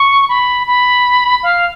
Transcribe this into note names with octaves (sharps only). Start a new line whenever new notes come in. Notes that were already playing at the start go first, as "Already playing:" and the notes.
Already playing: C#6
B5
B5
F5